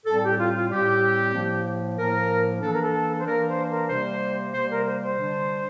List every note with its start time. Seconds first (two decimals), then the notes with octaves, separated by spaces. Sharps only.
0.05 A2 G3 C4 A4
0.21 G4
0.37 F4
0.53 F4
0.70 A2 G3 C4 G4
1.34 A2 F3 A#3
1.97 A2 F3 A#3 A#4
2.61 E3 A#3 D4 A4
2.72 A#4
2.82 A4
3.18 C5
3.25 E3 A#3 D4 A#4
3.47 C5
3.68 A#4
3.89 C3 G3 A#3 C5
4.53 C3 G3 A#3 C5
4.69 A#4
4.85 C5
5.02 C5
5.17 D3 G3 D4